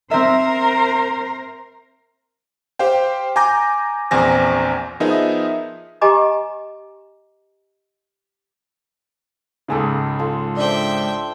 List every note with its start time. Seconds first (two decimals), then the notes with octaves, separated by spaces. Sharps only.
0.11 C4 A#4 C5 E5
2.79 G4 C5 F5 G5
3.36 G#5 A#5 D6 G6 A#6
4.11 A#1 E2 C4 G#5 A#6
5.00 F3 B3 D#4 G#4 A#4 E5
6.01 G4 D#5 G#5 A#5 D6
9.68 C#2 G#2 C#3 A#3 G#4 A4
10.19 F4 A4
10.56 D4 C5 E5 G5